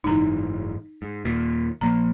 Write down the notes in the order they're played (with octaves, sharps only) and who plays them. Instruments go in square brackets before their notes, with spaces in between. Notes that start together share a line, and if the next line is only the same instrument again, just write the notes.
[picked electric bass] F#1 G#2 E3 [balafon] D#4 A#5
[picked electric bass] G#2
D#2 A#2
[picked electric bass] A#1 F3 A#3 [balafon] A#5